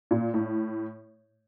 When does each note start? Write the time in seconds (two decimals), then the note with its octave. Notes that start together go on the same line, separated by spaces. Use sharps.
0.11 A#2
0.34 A2